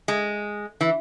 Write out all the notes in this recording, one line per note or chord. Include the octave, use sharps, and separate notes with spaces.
G#3
E3